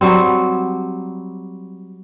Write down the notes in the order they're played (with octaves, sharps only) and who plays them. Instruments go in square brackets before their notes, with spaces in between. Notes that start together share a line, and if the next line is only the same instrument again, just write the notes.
[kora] F#3 G3 C4